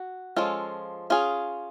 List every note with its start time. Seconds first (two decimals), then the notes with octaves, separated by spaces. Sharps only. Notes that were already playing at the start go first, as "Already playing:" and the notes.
Already playing: F#4
0.36 F3 G#3 C#4 F4 A4
1.10 C#4 F4 G#4